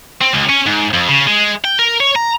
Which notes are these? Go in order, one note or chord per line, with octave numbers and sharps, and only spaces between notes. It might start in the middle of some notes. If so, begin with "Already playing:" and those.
C4
C#2
C#4
G#2
F2
C#3
G#3
G5
A#4
C#5
A#5